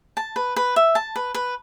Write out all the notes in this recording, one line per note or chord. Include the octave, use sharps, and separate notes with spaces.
A5
B4
B4
E5
A5
B4
B4